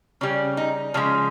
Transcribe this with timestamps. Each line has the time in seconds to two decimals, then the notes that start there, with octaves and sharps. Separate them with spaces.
0.21 C#3 G3 C#4
0.57 D#4
0.94 C#3 F3 G#3 C#4